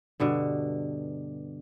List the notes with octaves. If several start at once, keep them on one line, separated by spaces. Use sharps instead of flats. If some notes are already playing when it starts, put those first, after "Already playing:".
G2 B2 D3